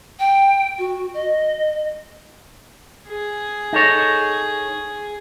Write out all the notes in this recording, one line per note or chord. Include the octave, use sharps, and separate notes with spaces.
G5
F#4
D#5
G#4
D#4 A4 C#5